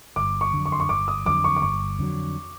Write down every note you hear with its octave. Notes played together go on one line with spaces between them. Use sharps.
G1 D6
C#6
F2 D3 F#3
C#6
C6
C#6
G1 D6
D#6
F2 D3 F#3 D6
C#6
D6
G1 C#6
F2 D3 F#3